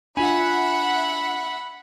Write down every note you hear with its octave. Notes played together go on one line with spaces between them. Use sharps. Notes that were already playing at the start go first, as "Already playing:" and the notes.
D4 F4 E5 F#5 G#5 B5